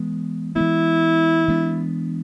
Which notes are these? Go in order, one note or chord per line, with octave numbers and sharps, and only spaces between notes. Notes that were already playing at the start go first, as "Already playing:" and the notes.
Already playing: E3 G#3 B3
E3 G#3 B3 E4
E3 G#3 B3 D4